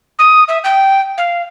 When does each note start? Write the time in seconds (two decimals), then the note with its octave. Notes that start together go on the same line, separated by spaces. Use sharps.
0.19 D#6
0.48 E5
0.64 G5
1.18 F5